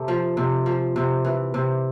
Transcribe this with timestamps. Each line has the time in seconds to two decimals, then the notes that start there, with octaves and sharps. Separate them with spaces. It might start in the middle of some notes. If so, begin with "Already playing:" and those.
Already playing: C3 A3
0.08 F3
0.37 C3
0.66 F3
0.96 C3
1.25 E3
1.54 C3